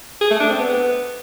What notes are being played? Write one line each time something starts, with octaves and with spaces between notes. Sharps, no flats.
G#4
A3
D4
C4
B3